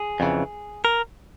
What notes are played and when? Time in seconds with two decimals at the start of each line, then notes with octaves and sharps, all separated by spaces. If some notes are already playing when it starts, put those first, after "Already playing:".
Already playing: G#4
0.20 F2 C#3 E3
0.85 A#4